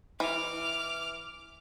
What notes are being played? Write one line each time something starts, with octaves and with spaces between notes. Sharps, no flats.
E3 D6 F6